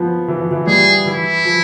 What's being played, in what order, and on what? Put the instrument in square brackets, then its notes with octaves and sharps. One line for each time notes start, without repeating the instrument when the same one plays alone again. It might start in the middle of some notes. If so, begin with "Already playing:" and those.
Already playing: [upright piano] F3 B3
E3
F3
E3
[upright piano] G3 [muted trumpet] G#4
[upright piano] E3 [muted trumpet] E4
[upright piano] F3